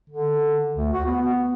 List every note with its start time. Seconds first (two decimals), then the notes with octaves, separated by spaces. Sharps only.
0.10 D3
0.76 D2
0.93 F#4
1.06 B3